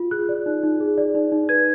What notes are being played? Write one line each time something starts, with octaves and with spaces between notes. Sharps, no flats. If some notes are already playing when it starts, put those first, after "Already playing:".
Already playing: F4
G#4 F#6
D5
D#4
D#4
G#4
D5
D#4
D#4
B4 G#6